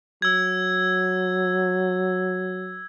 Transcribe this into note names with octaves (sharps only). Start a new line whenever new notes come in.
F#3 E6 G#6